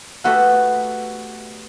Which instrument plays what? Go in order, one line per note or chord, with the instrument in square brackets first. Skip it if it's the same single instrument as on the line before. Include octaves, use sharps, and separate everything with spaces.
[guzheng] A3 B3 F#4 G4 A4 F#5